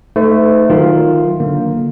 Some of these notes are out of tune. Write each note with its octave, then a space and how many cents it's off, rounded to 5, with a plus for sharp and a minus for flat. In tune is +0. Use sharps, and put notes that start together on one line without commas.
A3 +0 D#4 +5 C5 -45
D#3 +0 F#3 +0 F4 +5
D3 +0 A#3 +0